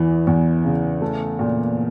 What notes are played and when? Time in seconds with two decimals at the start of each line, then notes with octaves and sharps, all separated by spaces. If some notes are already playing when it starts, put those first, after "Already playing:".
Already playing: E2 E3
0.27 E2
0.65 C#3
1.01 A3
1.39 A#2